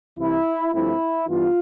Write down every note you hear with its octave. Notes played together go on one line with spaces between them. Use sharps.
C2 C3 E3 E4
G2 F3 A3 C4 E4
G2 E3 B3 F4